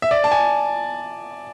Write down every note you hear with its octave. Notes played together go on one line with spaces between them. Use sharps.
E5
D5
A5
G#5